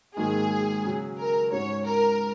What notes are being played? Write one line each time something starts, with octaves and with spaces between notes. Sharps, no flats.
G#2 D#3 F#3 A#3 G#4
C#3 F#3 C#4
A#4
G#2 G#3 C#4 F#4 C#5
A#4